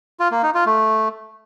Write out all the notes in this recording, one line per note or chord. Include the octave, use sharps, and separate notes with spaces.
F4
A#3
D#4
F4
A3